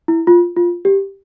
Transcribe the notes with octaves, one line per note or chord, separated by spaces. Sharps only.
E4
F4
F4
G4